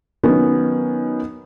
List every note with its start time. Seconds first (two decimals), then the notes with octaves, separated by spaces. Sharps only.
0.23 D#3 F#3 B3 C#4